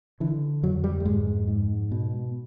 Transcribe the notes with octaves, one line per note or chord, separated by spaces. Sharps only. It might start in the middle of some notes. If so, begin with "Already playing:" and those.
D3 E3
F2 F#3
G3
G3
G#2 G#3
G#2
B2